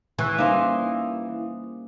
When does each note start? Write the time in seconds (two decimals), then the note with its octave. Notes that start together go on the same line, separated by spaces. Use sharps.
0.19 E3 G#5 C#6 F#6
0.38 G3 A#3 C#4 D#4 C5 F5 D6